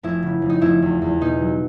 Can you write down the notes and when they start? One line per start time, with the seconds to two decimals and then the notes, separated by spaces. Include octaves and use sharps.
0.03 F1 E4
0.23 C#3
0.42 F1
0.49 D#4
0.61 F1 E4
0.82 E2
1.02 E2
1.21 B2 D#4
1.41 F#3